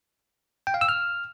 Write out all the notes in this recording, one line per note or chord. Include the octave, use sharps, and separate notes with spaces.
G5
F5
E6
F6